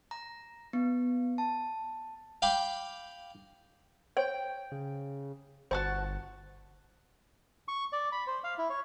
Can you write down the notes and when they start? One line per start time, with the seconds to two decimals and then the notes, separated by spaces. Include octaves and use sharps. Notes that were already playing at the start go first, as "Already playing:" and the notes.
0.11 A#5
0.73 B3
1.38 A5
2.42 F5 G5 B5 D6
4.17 C5 C#5 G5
4.72 C#3
5.71 G1 F#4 C5 A5 C#6
7.68 C#6
7.92 D5
8.12 B5
8.27 C5
8.44 F5
8.58 E4
8.70 C#5